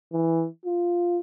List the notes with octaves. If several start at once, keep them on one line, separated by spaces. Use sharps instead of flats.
E3
F4